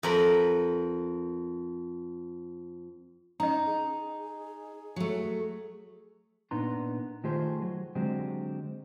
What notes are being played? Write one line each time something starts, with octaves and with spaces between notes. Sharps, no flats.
F2 A#4 B5
C#4 D#4 D#5 A#5
G#4
F#3 A3
A#2 B3 D4 D#4 A#5 C6
D#3 A3 F4 G4 G#4 C5
F#3
D3 F#3 G#3 C4 G4